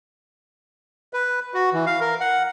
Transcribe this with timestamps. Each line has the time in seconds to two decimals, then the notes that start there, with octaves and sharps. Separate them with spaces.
1.13 B4
1.54 F#4
1.73 E3
1.86 F5
2.01 A#4
2.21 F#5